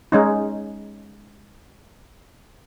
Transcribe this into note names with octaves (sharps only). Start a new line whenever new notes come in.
G#3 C#4 D#4